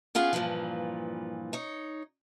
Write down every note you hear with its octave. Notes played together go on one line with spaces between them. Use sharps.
B3 C#4 F4 G#4
G2 A#2 C#3 E3 F3
D#4 C#5